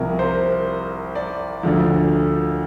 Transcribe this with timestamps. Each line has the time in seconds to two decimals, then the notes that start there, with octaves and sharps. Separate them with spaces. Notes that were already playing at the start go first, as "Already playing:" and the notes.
Already playing: C2 C3 F3 A#4
0.19 C5
1.15 D5
1.63 D2 D3 F3